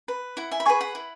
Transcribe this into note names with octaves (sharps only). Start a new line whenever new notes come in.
B4
E4 F#5
E5 G#5
B5
G#4 B4 G#5 C#6
F#5 B5
E4